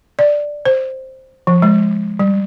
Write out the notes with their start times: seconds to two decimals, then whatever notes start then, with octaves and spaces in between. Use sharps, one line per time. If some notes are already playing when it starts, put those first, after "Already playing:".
0.19 D5
0.65 C5
1.47 F3
1.62 G#3
2.19 G3